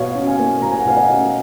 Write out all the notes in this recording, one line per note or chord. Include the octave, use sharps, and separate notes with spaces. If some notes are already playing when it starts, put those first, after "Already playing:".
Already playing: B2 C#5 F5
C#4
F5 G#5
A#3
B2 A#5
G#5
F#5
B2 F5 G#5
D#5 F#5
C#4